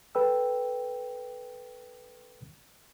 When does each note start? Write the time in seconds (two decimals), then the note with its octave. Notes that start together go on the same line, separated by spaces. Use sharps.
0.15 A4 B4 G5 E6